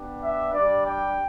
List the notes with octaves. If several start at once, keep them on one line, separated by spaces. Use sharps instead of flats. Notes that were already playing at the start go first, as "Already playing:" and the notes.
Already playing: B3 D4 G4
E5
G3 D4 G4 D5
G5